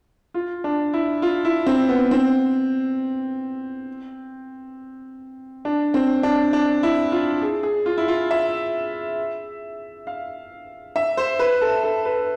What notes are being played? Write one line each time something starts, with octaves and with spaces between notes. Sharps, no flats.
F4
D4
E4
F4
E4
C4
B3
C4
D4
C4
D4
D4
E4
F4
G#4
G#4
F4
E4
F4
E5
F5
E5
C5
B4
A4
A4
B4